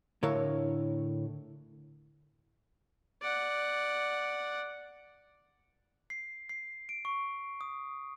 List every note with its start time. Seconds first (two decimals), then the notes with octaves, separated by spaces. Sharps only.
0.23 A2 D3 E4 A#4 C#5 F5
3.22 D5 F#5
6.10 C7
6.49 C7
6.89 D7
7.05 C#6
7.61 D#6